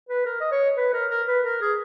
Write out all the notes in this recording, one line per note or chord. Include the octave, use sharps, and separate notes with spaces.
B4
A#4
D#5
C#5
B4
A#4
A#4
B4
A#4
G#4